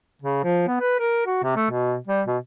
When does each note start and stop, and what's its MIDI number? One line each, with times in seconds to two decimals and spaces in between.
0.22 0.41 49
0.44 0.65 53
0.68 0.79 59
0.81 0.97 71
1.00 1.22 70
1.26 1.39 66
1.43 1.54 48
1.56 1.66 57
1.71 1.97 47
2.08 2.22 55
2.27 2.38 47